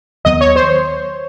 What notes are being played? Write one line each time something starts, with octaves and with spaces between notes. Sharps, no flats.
D#2 D#3 F#3 B3 D#5
C#5
C5